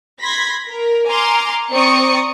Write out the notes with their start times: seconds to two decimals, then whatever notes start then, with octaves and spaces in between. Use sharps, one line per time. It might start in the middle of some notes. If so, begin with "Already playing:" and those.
0.21 B5 C6 G#6 A#6 B6
0.69 A#4
1.08 G#5 A#5 C6 D6 F6
1.71 C4 D5 A#5 C#6 D#6 C#7